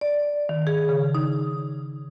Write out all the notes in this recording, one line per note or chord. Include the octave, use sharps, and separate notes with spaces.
D5
D#3
G#4
C#3
D#4